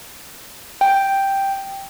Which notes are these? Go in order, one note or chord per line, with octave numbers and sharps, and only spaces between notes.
G5